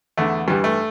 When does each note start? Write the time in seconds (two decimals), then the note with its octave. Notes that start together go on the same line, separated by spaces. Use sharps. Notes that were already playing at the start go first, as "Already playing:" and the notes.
0.17 E2 D3 A3
0.48 G2 E3 G3
0.64 A3